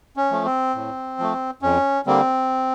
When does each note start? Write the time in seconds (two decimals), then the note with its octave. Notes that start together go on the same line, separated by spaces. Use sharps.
0.16 C#4
0.31 F3 A3
0.45 C4
0.75 A2
1.19 F3 A3
1.62 F2 C#4
2.06 D3 G3 A#3 C4